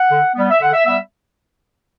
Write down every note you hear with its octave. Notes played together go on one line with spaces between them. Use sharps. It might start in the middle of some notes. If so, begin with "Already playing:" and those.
Already playing: F#5
D3
G3 B3
E5
D3 F#5
E5
G3 B3 E5